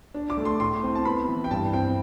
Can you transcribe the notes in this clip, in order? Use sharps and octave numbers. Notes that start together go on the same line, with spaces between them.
D4
D6
A3
C6
A2 C6
C4
A5
B3 B5
E3
G5
G2 A5
C4 G5